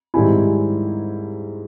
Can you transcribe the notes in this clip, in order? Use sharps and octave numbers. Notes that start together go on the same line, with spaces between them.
G#2 D#3 G3 C4 E4 G#5